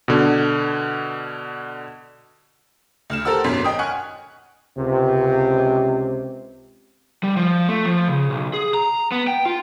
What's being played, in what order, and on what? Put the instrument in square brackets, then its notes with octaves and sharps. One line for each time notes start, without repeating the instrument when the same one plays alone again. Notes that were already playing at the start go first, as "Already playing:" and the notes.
[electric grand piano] B2 D3
[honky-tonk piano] D2 F6 E7
G4 A4 A#4 C5 F#5 E6
G#1 F#2 B2 C6 B6
D#5 G5 D#6
F#5 G#5 C#6 F6 F#6
[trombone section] C#2 C3
[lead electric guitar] G3
F3
A3
F3
C#3
B1
G#4
A#5
B3
G5
F4